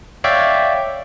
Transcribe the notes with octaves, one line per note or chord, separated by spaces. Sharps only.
C#5 D5 E5 F5 G5